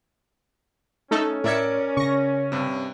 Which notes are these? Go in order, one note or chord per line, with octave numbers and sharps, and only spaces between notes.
A3 C#4 D#4 A4
A2 A#4 D5 E5 G#6 C#7
C#3 C#6 A#6
G2 C3